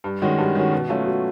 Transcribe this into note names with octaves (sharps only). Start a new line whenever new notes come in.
G2
D#3 G#3 C#4 F#4
G2
D#3 G#3 C#4 F#4
B2
F#3 A3 C#4 F4
B2